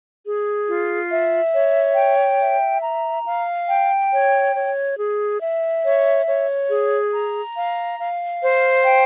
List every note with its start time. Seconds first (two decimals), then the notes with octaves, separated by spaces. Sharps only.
0.25 G#4
0.68 F4
1.10 E5
1.53 C#5
1.96 G5
2.40 E5
2.82 A#5
3.26 F5
3.68 G5
4.11 C#5
4.54 C#5
4.98 G#4
5.40 E5
5.84 C#5
6.26 C#5
6.69 G#4
7.12 A#5
7.55 F5
7.98 F5
8.42 C5
8.84 G5